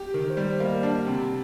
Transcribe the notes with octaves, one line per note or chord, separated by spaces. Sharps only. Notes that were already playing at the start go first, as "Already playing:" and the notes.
Already playing: G4
D#3 A#4
C5
G3
D5
A#3 D#5
D4 F#5
A5
C3 G5